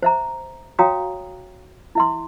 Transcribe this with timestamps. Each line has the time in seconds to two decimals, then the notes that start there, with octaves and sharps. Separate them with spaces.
0.02 C5 E5 A#5
0.79 F#4 C#5 F5 G5 A#5 D#6
1.95 E4 E5 C6